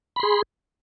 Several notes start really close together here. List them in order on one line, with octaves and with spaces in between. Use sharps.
B5 C6 G#4